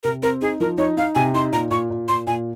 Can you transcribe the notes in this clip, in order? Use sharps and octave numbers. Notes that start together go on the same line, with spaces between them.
C3 A#4
C4 A#4
D#4 G#4
F3 A#4
D#4 C#5
D#4 F5
C3 G#5
D#4 C6
A#2 A#5
A#2 C#6
A#2
A#2 C6
A#2 G#5